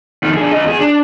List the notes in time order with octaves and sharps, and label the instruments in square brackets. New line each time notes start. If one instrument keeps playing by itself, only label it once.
[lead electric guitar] F2 D#3
D4 G#4
C#4 D#5
E2 G#4
D4